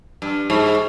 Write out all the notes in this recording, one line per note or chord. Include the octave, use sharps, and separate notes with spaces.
G2
G#2